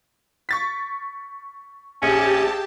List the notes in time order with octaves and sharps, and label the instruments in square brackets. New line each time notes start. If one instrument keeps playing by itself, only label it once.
[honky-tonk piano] C#6 A6 B6
[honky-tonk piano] A#1 [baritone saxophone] C#4 [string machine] G4 A5 [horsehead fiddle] G#4